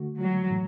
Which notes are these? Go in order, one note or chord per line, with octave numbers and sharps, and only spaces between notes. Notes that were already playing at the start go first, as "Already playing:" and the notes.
Already playing: D3 A3 F#4
F#3
A2 E3 A3